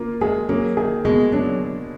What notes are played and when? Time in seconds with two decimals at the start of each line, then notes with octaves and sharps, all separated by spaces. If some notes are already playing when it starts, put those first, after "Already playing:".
Already playing: A#3 F4
0.21 G#3 G#4
0.49 F#3 A#3
0.77 D#3 G#4
1.05 B2 G#3
1.32 F#3 D4